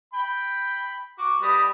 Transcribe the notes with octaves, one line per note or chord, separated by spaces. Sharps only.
G5 B5
F#4 D6
G3 B4 D#5